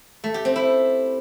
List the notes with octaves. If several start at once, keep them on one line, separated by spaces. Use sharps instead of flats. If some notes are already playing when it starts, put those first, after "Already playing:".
A3
G4
C4
E4